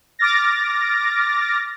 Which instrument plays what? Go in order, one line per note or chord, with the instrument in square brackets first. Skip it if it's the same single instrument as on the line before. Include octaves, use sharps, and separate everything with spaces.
[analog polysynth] D6 F6 A6 A#6